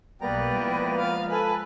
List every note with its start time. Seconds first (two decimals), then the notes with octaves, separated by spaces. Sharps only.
0.21 B1 G3 A#3 B3 B4 D5 G5 A#5
0.56 F3 G#3 E4
0.99 F5
1.30 A4 B4 G#5